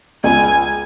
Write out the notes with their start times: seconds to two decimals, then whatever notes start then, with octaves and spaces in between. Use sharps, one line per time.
0.24 C#2 G#5